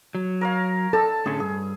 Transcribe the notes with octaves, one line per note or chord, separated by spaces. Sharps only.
F#3
A#4 C#5 F5
A4 A5 E6
A2 D3 C#4 G#4
G2 G#4